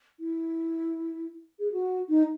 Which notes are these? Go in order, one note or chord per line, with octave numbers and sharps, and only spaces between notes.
E4
G#4
F#4
D#4